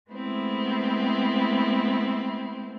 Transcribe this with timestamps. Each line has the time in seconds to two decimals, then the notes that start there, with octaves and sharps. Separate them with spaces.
0.10 G#3 A3 B3 C4 E4